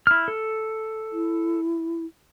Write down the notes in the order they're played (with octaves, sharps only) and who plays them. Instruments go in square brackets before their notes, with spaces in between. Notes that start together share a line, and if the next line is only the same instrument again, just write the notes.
[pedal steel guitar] E4 F6
A4
[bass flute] E4